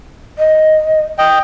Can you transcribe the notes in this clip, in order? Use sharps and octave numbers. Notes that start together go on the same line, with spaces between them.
D#5
D#5 G5